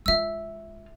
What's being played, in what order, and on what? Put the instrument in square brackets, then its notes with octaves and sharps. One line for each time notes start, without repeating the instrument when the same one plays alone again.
[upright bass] G#3 F4 [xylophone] E5 E6